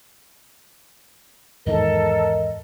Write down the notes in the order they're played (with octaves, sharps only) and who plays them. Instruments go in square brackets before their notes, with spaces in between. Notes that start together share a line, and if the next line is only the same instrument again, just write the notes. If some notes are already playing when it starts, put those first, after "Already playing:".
[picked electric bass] E2 G#2 D#3 [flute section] A4 [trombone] A#4 [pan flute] D#5